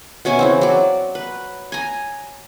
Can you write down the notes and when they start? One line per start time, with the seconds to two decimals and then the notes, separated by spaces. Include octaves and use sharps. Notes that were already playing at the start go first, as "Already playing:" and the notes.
0.25 B2 C#4 E5 G#5
0.39 C#3 E3 C4
0.61 F#3 D5
1.15 B4
1.72 G#5 A#5